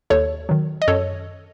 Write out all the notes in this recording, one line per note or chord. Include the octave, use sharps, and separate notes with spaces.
D#2 A4 C#5
D#3 F#3
D#5
F#2 A4 C#5